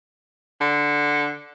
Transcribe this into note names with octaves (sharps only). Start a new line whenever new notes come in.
D3